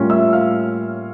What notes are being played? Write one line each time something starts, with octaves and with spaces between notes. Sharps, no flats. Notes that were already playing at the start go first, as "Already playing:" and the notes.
Already playing: A2 G3 A#3 C#4 F4
E5 E6
F5 F6